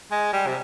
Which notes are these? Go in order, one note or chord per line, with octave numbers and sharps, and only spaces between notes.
G#3
G3
C3